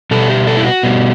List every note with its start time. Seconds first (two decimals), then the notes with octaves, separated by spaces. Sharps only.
0.11 B2 G3 A4
0.29 G4
0.47 A4
0.57 E4
0.65 F#4
0.83 B2 G3